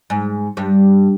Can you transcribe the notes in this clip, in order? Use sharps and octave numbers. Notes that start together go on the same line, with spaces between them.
G#2
G2